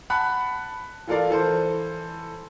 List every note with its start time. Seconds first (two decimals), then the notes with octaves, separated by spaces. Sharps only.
0.10 F#5 A5 B5 F#6
1.07 E3 F4 A4 A#4 D5 F5
1.30 E3 A4 C5